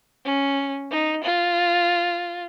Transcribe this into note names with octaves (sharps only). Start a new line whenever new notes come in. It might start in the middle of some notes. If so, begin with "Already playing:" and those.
C#4
D#4
F4